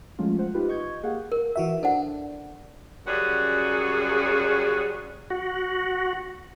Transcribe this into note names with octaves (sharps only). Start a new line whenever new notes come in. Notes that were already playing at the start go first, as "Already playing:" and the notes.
F3 F#3 G#3 A3 C#4 F4
C5 F#5
D#4 F4 G4 B4
D#5 C#6 G6 G#6
A#3 G4 G#4 F5 F#5
A#4
E3 F#4 E5
D4 A4 C5 F#5
F#2 C#3 G3 F#4 G#4
F#4